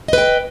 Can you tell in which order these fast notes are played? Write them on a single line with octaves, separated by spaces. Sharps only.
D#5 B4 G5